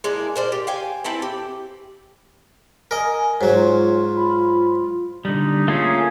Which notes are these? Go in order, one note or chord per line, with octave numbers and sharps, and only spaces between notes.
G#3 A#3 D4 E4
A#4 C5 D5
G4
F5 G5 G#5
C4 E4 A4 B4
G4
A#4 D#5 G#5
G#2 F#3 F#4 C#5
F4
B5
D3 G3 D#4
A3 A#3 C#4 F4 G#4